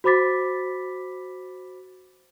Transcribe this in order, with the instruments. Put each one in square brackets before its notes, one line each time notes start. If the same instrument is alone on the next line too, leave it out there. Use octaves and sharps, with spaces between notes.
[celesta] F#4 C5 B5 D6 A6 B6